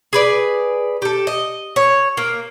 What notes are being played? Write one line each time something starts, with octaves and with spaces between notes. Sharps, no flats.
G#4 B4 D5
G4 A4
D#5
C#5
A#3